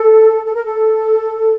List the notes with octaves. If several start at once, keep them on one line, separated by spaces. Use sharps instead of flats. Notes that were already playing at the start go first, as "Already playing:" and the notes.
Already playing: A4
A4
A#4
A4